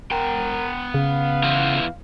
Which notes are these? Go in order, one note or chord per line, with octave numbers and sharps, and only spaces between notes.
B3 A#4 G5
C#3 F5
E2 E3 F4